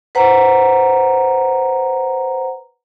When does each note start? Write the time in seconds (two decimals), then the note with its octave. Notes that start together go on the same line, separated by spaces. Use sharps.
0.15 B4 C5 F#5 A#5